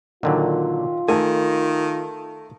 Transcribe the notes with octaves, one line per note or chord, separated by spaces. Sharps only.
A#2 D3 D#3 F#3 F4
D#3 A3 A4 G#5